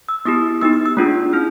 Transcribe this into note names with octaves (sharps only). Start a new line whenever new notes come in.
E6
B3 E4 G4 D#6
B3 D#4 G4 E6
E6
E6
A3 D4 F4 G#4
C#4 E4 F6